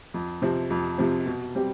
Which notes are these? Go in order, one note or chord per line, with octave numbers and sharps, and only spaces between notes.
F2
C3 F3 C4
F2
C3 F3 C4
B2
G3 C4 G4